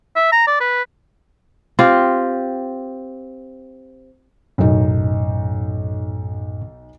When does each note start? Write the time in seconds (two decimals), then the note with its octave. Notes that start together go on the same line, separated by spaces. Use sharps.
0.16 E5
0.32 A#5
0.47 D5
0.60 B4
1.79 C4 F4 G4
4.58 B1 F#2 A2 D#4